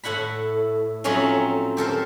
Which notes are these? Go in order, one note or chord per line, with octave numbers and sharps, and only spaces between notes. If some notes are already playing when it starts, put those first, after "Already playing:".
A2 A3 E4 F#5 B5
F3 F#3 A3 C4 C#4 D#4
G4 A4 A#4 C5